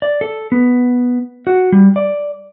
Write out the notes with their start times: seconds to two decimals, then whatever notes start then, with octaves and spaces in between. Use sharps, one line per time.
0.02 D5
0.21 A4
0.52 B3
1.47 F#4
1.72 G3
1.96 D5